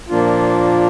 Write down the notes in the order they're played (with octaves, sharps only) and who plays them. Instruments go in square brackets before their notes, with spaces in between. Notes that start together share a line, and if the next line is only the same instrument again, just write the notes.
[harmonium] A#2 F3 A#3 D4 F4